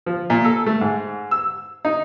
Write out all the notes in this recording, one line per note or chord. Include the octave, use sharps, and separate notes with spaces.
F3
A#2
A4
A3
G#2
E6
D#4